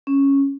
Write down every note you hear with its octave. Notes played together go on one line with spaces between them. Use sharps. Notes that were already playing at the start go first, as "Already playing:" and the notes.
C#4